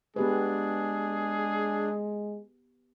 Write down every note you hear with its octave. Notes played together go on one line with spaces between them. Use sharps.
G#3 B3 D4 G4 G#4 B4